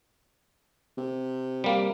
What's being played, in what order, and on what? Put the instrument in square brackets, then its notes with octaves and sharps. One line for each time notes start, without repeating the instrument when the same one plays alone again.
[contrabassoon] C3
[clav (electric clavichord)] G3 A#3